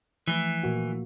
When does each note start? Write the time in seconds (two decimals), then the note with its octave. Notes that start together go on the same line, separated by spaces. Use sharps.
0.28 E3 F3 A3
0.63 A#2 A#3 F#4